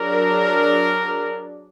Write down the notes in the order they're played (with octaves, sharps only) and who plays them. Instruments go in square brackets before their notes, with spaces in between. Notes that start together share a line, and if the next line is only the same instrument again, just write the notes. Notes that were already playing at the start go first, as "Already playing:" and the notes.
Already playing: [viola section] F#3 D4 G#4 D5 [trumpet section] A#4